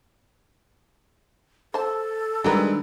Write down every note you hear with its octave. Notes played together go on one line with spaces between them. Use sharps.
A4 C5 A5
D#3 G3 G#3 D4 F#4 G4 A#4 B4